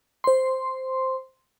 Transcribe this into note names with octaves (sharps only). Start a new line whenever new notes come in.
C5 C6